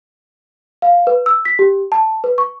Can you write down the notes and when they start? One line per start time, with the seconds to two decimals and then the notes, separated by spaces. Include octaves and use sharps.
0.82 F5
1.07 B4
1.26 E6
1.45 B6
1.59 G4
1.92 A5
2.24 B4
2.38 C#6